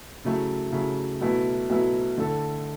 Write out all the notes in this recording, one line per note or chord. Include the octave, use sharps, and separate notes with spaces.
C#3 F#3 A3 E4
C#3 F#3 A3 E4
B2 F#3 A3 E4
B2 F#3 A3 E4
D3 A3 E4 A4